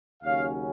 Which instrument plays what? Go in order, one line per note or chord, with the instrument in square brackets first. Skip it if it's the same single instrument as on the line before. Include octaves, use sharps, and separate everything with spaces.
[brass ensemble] D#2 C#3 F#3 C#4 C#5 F5